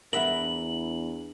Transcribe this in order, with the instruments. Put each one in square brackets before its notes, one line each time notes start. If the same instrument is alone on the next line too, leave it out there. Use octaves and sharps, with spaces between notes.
[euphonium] E2 [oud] D4 E4 [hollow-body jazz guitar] A#4 E5 F#5 [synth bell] F#7